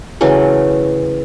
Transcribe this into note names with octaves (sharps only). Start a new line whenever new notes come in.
C#3 E3 F#3 A3